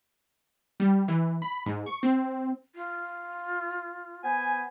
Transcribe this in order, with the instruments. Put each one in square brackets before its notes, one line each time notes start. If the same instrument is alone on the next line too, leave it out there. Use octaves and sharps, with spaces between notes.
[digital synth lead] G3
E3
B5
G#2
C#6
C4
[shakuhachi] F4
[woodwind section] B3 C5 G#5